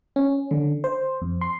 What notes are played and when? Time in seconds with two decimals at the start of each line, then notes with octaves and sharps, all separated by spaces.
0.16 C#4
0.51 D3
0.84 C5
1.21 F2
1.41 C6